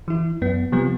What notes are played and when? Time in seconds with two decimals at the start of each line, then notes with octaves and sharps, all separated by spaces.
0.08 E3 E4
0.42 F#2 B3
0.72 C3 F3 G3 B3